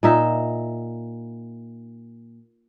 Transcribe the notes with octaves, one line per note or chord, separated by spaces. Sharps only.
A#2 D#4 E5